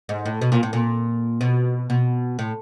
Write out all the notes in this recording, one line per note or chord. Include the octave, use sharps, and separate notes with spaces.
G#2
A2
B2
A#2
A2
A#2
B2
B2
A2